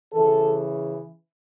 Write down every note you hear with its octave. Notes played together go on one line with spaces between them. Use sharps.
C#3 E3 A4